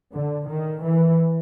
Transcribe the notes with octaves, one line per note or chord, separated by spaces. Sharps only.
D3
D#3
E3